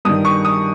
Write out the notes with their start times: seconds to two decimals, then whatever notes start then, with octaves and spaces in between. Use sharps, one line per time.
0.05 G2 D#3 D#6
0.25 C#6
0.45 D#6